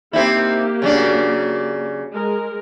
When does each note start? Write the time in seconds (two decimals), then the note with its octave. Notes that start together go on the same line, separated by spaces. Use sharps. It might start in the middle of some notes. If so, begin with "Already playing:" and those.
0.13 A#3 C4 D#4 E4 G4
0.82 C#3 F#3 D4
2.12 G#3 A#4